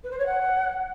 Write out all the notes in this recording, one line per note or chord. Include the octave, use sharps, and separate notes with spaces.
B4
C5
C#5
F#5